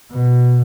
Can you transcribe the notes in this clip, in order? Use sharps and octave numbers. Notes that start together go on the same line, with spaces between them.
B2